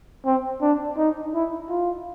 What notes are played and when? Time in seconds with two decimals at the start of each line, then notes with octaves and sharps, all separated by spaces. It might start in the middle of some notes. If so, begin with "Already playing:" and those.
0.26 C4
0.61 D4
0.98 D#4
1.34 E4
1.69 F4